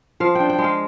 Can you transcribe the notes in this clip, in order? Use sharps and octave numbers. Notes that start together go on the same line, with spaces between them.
F3 F5
D4 G5
G5
G#3
F5